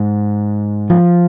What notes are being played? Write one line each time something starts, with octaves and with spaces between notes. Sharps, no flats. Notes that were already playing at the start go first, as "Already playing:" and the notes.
Already playing: G#2
F3